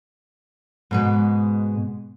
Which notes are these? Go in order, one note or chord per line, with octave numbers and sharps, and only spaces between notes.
G#2 B2 G#3